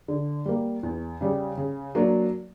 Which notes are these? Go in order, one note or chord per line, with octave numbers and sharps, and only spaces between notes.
D3
G3 A#3
E2
C#3 G3
C#3
F#3 A#3 D4